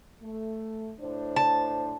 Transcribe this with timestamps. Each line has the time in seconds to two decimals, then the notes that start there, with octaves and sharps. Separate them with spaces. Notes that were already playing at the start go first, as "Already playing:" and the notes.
0.21 A3
1.00 A2 D4 C5
1.36 A5